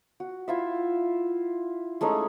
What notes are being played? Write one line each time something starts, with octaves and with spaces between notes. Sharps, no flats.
F#4
E4 F4 E5
G#3 A3 C#4 D#4